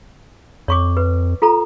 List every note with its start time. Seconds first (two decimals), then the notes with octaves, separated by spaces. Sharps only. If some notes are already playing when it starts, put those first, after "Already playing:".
0.68 F2 C#5 C#6 D6
0.97 B4
1.42 F4 A4 A#5